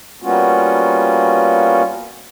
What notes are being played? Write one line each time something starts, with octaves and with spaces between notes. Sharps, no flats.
G3 A#3 B3 C#4 F4 F#4